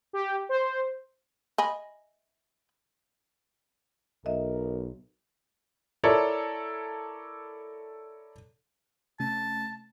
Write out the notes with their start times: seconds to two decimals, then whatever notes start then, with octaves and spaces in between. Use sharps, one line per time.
0.13 G4
0.49 C5
1.58 D#5 G#5 B5
4.26 B1 A#4 D#5 E5
6.04 E4 A4 A#4 C#5 D5
9.20 C3 A3 C#4 A5